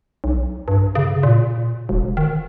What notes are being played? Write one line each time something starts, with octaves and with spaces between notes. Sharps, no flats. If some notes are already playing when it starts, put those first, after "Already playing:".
B1
G2
C#3
A#2
E1
D#3